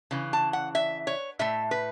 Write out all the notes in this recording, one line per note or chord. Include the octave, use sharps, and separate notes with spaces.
C#3 E3
A5
F#5
E5
C#5
A2 A3 E5
B4